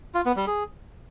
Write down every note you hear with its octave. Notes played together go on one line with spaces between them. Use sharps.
F4
B3
G3
G#4